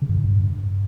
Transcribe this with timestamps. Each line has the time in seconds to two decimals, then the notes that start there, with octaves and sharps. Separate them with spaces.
0.02 C#3
0.09 G2
0.17 G#2
0.24 G2